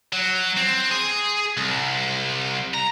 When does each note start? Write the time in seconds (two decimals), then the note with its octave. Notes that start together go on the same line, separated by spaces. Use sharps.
0.13 F#3
0.57 C4
0.91 G#4
1.57 C2
2.74 A#5